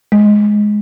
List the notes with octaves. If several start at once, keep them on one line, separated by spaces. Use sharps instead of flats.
G#3